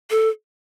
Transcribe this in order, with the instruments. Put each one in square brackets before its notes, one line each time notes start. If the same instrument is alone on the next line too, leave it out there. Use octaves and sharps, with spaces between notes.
[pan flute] A4